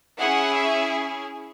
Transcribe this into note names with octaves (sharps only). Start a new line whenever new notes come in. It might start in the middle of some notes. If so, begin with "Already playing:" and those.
C#4 E4 G#4 F#5
E5